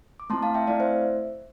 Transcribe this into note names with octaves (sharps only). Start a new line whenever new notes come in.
D6
A3 C4 E4 A5 C6
F5 A5
E5 G5
A3 C4 E4 A4 D5 F5
C5 E5